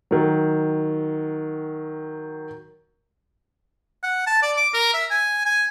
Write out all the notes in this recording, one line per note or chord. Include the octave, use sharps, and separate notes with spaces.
D#3 F#3
F#5
A5
D5
D6
A#4
E5
G#5
G#5